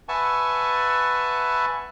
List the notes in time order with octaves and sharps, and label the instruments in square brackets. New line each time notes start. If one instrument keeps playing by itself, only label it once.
[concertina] B4 E5 F#5 G#5 A5 C#6